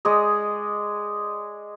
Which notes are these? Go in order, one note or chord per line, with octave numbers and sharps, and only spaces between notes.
G#3 G#4 D5 D#5